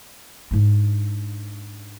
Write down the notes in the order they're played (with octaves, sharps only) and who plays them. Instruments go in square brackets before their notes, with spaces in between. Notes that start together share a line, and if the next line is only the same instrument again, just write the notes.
[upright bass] G#2 D4